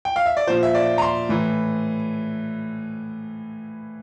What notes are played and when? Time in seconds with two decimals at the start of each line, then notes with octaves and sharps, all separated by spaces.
0.05 G5
0.16 F5
0.26 E5
0.37 D5
0.47 A#2 F3 C5
0.63 E5
0.75 D5
0.98 A#5
1.02 C6
1.29 A2 E3